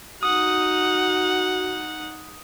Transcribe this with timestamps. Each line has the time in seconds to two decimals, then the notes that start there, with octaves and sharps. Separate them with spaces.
0.23 D#4 F#4 F#5 D#6